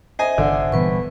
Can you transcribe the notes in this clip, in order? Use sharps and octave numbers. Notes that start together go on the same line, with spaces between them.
C5 D#5 E5 G#5
G1 D3
A#2 E3 G3 B3 B4 C#6